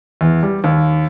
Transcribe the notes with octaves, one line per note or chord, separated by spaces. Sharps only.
E2
G3
D#2